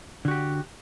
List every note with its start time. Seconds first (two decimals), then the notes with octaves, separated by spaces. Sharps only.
0.25 D3
0.28 F#4
0.31 G4